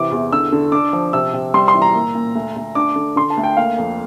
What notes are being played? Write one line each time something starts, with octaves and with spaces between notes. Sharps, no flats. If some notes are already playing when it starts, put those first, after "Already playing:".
Already playing: C3 E3 D6
E2
D3 E6
D3
D4 D6
F3
C3 E6
C3
G3 C6
C6
E3
A#5
A#2
A#2
D2
D2
D4 D6
D3
D3 C6
A5
D2
G5
A#3 F5
F2